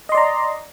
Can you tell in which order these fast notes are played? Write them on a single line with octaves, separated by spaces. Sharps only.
D#5 C6 D5 A#5